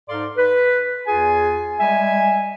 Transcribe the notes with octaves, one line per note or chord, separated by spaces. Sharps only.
G#2 D#4 A4 D5 F5 C6
B4
E2 F4 G#4 G#5
G3 G#3 E5 G#5